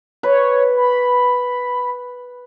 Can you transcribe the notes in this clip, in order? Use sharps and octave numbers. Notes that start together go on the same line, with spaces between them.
B4 C#5
B5